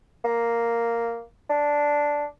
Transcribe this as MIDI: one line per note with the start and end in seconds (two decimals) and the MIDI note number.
0.24 1.22 58
1.49 2.25 62